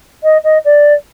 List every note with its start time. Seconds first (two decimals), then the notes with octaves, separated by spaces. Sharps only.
0.23 D#5
0.44 D#5
0.65 D5